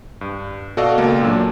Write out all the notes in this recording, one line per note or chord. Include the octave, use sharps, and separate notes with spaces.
G2
B2 F#4 A4 D5 D#5 F5
C#2 A#3
A#2 F#3 D4